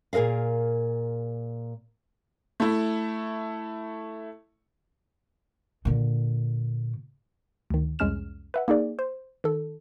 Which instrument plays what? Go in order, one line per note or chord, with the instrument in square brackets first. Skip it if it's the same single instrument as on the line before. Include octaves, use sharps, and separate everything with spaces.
[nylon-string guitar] A#2 G#4 A#4 D#5 F5
[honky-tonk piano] A3 E4
[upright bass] A#2 D3
[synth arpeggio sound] D2 D#3
C2 F2 G#3 C#4 F6 E7
B4 E5 F#5
A#3 D#4 G#4 D5
C5
D#3 A4